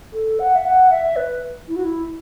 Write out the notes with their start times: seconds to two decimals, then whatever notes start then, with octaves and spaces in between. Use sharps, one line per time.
0.13 A4
0.39 F#5
0.55 E5
0.65 F#5
0.90 E5
1.16 B4
1.68 E4
1.76 F#4
1.84 E4